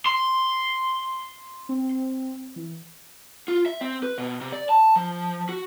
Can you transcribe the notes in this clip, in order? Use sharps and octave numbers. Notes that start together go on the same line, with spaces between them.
C6
C4
E3
F4
E5
C4
B4
B2
C3
D5
A5
F3
F#4